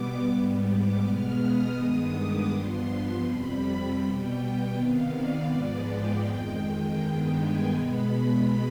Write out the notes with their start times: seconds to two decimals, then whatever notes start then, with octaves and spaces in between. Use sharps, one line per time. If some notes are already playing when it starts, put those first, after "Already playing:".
Already playing: B2 G3 B3 D6
0.26 G#2 G3 B3
0.63 D6
1.00 B2 G#3 B3 F6
1.38 D#6
1.74 G2 D#3 G#3 B3 D#6
2.12 D6
2.49 G2 F3 B3 C6
3.23 F2 C3 G3 B5
3.98 B2 G3 B3 G5
4.72 C3 D#3 B3 F5
5.10 D5
5.47 G#2 F3 G#3 B3
5.84 G5
6.22 F2 D#3 G#3
6.59 G5
6.96 G2 D#3 G#3 B3 G5
7.33 G#5
7.71 B2 G#3 B3 B5